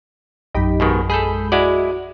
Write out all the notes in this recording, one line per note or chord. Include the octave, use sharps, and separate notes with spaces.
A#1 F#2 D#4 G4 B5
G#2 B2 D#3
G#3 G#4 A4 B5 G6
G#3 E4 F#4 D5